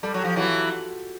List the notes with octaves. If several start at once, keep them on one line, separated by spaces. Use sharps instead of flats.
G3 A4
F#3
F3 G4
E3 F#3 F#4
F4